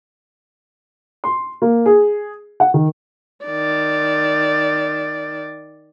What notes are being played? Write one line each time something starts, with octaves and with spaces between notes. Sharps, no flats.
C6
A#3
G#4
F#5
D#3
D#3 D5